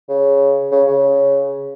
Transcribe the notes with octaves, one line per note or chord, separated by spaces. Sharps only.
C#3
C#3
C#3